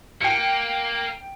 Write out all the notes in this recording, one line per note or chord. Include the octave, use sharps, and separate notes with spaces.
A#3 G5 C#7